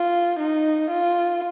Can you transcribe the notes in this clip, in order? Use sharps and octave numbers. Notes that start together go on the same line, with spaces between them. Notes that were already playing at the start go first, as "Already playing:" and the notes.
Already playing: F4
D#4
F4